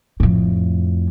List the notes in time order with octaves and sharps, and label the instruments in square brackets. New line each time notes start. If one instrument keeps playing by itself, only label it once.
[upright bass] F2 A2